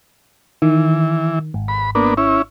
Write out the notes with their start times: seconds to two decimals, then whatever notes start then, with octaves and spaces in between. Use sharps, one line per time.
0.62 D#3 E3
1.54 G#1
1.68 B5
1.95 A#3 B3 D4
2.17 C#4 E4